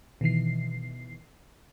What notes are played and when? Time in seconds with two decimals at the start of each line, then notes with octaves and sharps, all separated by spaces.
0.21 B2 D#3 E3 C7